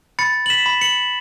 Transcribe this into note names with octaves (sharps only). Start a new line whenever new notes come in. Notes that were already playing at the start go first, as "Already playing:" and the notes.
B5 A6 C#7
F#7
B6 E7
B5
C#7 F#7